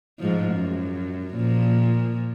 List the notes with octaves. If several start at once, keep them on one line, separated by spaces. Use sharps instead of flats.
G#2 F3
F#2
A#2 F3